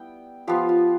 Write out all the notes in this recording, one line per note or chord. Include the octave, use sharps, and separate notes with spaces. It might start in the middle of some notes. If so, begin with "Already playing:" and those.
Already playing: G3 B3 E4 G5
F3 B3 F4 G4
F4